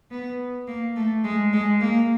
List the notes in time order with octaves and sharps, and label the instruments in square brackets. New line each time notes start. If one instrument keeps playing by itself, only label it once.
[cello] B3
A#3
A3
G#3
G#3
A#3